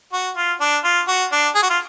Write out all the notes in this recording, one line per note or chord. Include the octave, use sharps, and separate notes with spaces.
F#4
F4
D4
F4
F#4
D4
G#4
F#4
F4